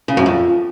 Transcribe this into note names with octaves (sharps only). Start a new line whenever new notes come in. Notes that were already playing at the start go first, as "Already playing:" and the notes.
C#3
F#2
F2